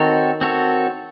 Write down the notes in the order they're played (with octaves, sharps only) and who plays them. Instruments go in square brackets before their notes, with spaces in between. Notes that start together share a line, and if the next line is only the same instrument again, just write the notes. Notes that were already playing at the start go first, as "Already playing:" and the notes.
Already playing: [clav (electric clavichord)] D#3 [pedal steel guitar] C4 F#4 A4 C#5
[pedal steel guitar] C4 F#4 A4 C#5